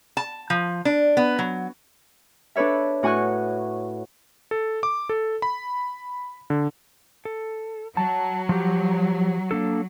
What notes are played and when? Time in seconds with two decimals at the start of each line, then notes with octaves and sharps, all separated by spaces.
0.17 A5
0.50 F3
0.85 D4
1.17 B3
1.39 F#3
2.56 D4 A4 B4 C#5 E5
3.03 A2 F#4 G#5 C#6 F#6
4.51 A4
4.83 D6
5.09 A4
5.42 B5
6.50 D3
7.25 A4
7.97 F#3 A5
8.49 F3 G4
9.51 A#3 D4 A4